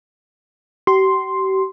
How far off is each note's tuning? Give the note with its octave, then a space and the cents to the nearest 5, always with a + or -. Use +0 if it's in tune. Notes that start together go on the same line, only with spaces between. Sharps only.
G4 -40 C6 +0